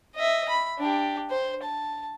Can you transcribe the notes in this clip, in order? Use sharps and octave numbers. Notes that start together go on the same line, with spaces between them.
D#5 E5
B5
D4 G4
C5
A5